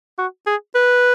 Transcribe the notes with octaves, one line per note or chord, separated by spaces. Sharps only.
F#4
G#4
B4